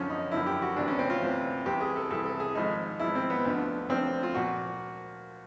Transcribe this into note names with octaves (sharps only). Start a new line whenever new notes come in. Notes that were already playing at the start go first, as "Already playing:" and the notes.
Already playing: F#2 D3 F3 C#4
D#4
F#2 D3 F3 E4
G4
F#4
D2 C3 E3 D4
C#4
C4
F4
D2 C3 E3
C2 C3 E3 G4
G#4
A4
C2 C3 E3 A4
A4
G#4
G#1 G#2 F3 D#4
G#1 G#2 F3 E4
C4
B3
D2 D3 F3
D2 D3 F3 C4
F4
A#2 F3 F#4